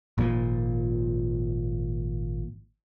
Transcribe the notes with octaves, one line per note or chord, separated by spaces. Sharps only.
G#1 A#2 D3 F3